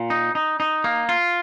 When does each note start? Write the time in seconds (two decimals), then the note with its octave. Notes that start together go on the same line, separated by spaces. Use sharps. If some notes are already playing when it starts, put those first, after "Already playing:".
Already playing: A#2
0.10 D#4
0.35 D#4
0.60 D#4
0.84 A#3
1.09 F4